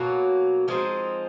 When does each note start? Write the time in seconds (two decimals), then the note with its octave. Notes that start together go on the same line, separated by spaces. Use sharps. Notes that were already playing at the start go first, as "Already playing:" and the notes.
Already playing: B2 F#3 A#3
0.68 F3 G#3 C4 D#4